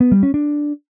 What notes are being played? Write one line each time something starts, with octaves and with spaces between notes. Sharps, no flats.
B3
G3
C#4
D4